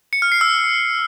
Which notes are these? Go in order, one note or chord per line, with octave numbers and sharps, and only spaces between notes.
C#7
F6
C7
E6